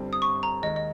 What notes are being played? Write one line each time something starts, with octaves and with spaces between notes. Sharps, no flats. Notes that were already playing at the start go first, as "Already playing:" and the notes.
Already playing: G1 G2 G3 C4
D#6
C#6
A#5
D#2 D#3 G#3 D#5
D#5